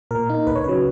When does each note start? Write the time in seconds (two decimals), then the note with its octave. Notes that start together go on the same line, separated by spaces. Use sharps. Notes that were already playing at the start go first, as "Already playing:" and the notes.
0.11 A#2 A#4
0.29 A#3 D#4
0.47 C#2 B4
0.55 C#5
0.64 C#3 F#3 B4